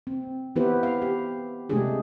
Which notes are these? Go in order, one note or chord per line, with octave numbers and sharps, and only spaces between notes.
C4
E3 B3 E4 G4 B4 C5
F5
G4
C3 G#3 A3 D4 G4 G#4